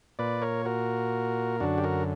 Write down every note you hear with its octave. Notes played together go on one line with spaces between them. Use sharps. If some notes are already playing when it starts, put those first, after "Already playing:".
A#2 B4 D5
A#4 C#5
F#4 A#4
F#2 D3 D4 F#4
G4
F#4 A#4